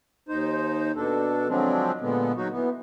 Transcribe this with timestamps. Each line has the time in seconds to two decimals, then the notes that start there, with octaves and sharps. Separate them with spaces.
0.29 D#2 D#4 C5
0.96 B2 D4 A4
1.48 D3 F3 F#3 G#3 C4 D4
2.01 A#2 D3 G#3 B3
2.36 F#3 D#4 F#4
2.52 E3 B3